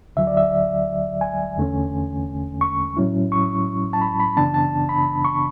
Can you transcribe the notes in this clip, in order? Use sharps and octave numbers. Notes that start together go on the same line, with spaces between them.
D2 D3 F#3 E5
D5
E5
G#5
E2 D3 A3 C#4
C#6
A2 F#3 C#4 E4
C#6
A5
B5
B5
F#2 C#3 E3 B3 D4 A5
A5
B5
C#6